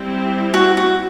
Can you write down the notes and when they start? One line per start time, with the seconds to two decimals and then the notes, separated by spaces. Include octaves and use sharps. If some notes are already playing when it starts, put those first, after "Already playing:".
Already playing: G3 C4 E4
0.54 F#4
0.77 F#4